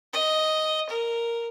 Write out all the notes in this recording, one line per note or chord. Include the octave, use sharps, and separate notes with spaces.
D#5
A#4